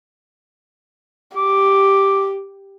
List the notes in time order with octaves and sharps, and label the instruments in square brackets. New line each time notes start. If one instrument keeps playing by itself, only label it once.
[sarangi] G4 [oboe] D6